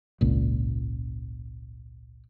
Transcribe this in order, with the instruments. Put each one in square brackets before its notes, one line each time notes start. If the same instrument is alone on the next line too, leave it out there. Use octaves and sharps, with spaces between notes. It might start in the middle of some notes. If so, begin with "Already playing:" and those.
[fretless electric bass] G#1 C#2 A#2